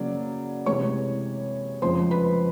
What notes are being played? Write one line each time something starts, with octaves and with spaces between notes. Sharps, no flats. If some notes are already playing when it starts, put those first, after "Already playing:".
Already playing: C#3 F#3 A#3 D5
C3 E3 G#3 C#5 C#6
F2 C#3 F3 G#3 C5 C6
B4 B5